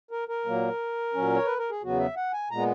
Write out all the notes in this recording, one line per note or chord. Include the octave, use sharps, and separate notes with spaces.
A#4
A#4
A#2 F#3 A#3
A#2 F#3 C#4
C#5
B4
A#4
G#4
E2 C#3 F#3 B3 F#4
E5
F#5
G#5
A#2 G#3 B3 A#5